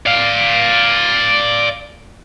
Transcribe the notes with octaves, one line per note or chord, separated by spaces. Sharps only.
D5 F5